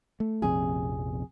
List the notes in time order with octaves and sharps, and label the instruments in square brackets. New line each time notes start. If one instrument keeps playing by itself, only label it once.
[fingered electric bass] A3
[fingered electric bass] A#1 F2 C3 [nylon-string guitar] G#4